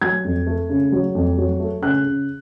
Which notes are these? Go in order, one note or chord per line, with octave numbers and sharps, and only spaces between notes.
F#3 G#6
F2
A3
C#3
F#3
F2
F#3
A3
C#3 F#6
C#3